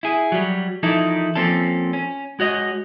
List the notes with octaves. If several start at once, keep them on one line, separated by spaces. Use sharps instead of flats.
E4 G#4
F#3 G3
E3 F3 D#4 E4 A4 A#4
F3 A#3 C4 C#4 A4
C#4
G#3 F#4 C#5 D#5